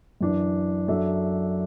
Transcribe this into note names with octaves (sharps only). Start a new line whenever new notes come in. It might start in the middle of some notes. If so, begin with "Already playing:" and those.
F#2 E3 D4
F#2 F#3 D4 A4 E5